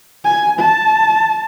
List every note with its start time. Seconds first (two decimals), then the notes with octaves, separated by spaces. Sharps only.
0.24 G#5
0.59 A5